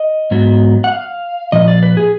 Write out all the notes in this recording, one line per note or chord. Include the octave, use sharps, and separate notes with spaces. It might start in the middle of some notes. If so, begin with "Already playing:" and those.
Already playing: D#5
G#2 F#3 B3
F#5
F5
A#2 F3 D#5
D5
B4
G#4